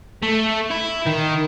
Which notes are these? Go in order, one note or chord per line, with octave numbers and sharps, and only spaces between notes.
A3
E4
D#3